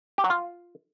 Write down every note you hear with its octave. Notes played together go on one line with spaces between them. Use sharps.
G4
F#3
F4